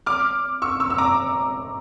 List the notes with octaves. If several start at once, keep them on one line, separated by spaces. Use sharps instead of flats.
D6 F6
C#6 E6
C#6 E6
E6
A#5 D6